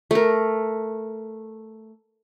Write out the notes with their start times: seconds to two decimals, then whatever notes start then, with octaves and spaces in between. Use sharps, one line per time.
0.11 A3 A#4